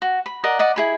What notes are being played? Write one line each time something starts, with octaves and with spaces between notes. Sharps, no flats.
F#4
B5
A#4 D5 D#5 F#5
D5 D#5 F#5
E4 G#4 B5